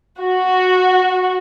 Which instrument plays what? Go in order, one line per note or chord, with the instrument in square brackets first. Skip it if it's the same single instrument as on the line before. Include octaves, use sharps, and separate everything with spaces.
[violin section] F#4